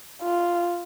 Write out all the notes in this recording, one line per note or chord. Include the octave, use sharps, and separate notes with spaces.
F4